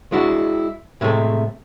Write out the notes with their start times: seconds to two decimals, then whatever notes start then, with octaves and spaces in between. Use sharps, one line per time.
0.12 G#3 D4 E4 F#4
1.01 A2 C3 G#3 A3